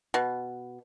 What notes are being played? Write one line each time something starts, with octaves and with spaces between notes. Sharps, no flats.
B2